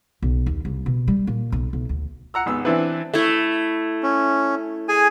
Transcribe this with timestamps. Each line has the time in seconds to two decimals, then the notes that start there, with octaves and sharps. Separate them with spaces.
0.22 B1
0.46 D#2
0.65 C2
0.86 B2
1.08 G3
1.27 A#2
1.52 B1
1.73 B1
1.89 D2
2.34 F#5 A#5 E6
2.46 G#1 B3 E6
2.65 E3 C4 D4 E4 B4
3.14 A3 E4
4.03 C#4
4.89 G#4 G#5